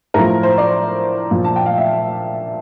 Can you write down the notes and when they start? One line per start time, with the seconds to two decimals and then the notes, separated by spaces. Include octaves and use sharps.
0.14 A2 F3 A#4
0.43 C5
0.58 D5
1.31 A#2 F3
1.45 A5
1.56 G5
1.66 F5
1.78 E5